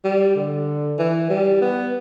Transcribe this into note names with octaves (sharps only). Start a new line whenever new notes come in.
G3
D3
E3
G3
B3